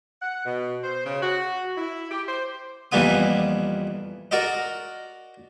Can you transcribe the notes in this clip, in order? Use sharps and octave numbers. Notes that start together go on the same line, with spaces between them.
F#5
B2
C5
C#3
F#4
E4
G4
C5
F2 E3 G3 A#3 B3 D#6
F#4 A#4 D5 D#5